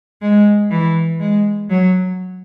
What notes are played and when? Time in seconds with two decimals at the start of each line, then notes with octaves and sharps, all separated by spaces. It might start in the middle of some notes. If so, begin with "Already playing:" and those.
0.22 G#3
0.70 E3
1.20 G#3
1.70 F#3